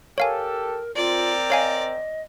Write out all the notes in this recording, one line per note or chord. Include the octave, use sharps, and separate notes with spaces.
G4 A4 A#4 C#5 F5 G#5
C4 F4 A#4 C5 D5
C#5 D#5 F5 G#5